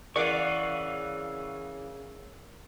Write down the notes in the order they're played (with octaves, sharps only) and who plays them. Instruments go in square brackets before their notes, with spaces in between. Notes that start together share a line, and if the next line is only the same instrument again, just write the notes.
[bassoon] C#3 [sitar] E3 D5 [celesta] A#4 [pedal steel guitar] F5 F#5 C#6